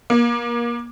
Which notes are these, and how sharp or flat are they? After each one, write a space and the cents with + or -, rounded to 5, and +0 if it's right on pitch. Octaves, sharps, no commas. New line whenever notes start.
A#3 +25